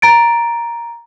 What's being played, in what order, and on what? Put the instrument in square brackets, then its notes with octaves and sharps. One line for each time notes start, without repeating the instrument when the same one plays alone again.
[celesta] A#5 A6 D7